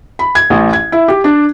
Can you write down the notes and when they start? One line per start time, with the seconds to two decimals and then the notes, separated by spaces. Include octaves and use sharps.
0.19 B5
0.35 G#6
0.50 A1
0.73 G#6
0.92 E4
1.08 G4
1.24 D4